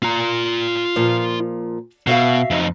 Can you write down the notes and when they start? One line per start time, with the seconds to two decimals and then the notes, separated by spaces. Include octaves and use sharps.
0.03 F4 A#5
0.96 A#2 F3
2.07 B2 F#4 E5 F5
2.51 F2 D#4